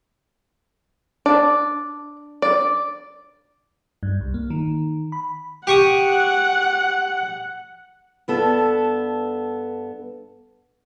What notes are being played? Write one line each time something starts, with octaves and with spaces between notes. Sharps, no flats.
D4 D5
D5
G2
C2
A#3
D#3
B5
G4 F#5 C#6 D#6
G2 B3 A4 A5